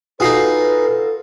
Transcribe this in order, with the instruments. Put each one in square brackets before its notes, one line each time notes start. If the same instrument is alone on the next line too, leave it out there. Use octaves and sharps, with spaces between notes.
[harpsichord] D#4 G#4 [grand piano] F4 F#4 C7 [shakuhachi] A4 [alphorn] B4